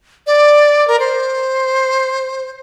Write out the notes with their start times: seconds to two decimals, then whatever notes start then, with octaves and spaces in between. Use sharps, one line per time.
0.27 D5
0.88 A#4
1.00 C5